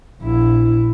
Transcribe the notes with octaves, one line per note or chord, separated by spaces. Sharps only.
A#1 E4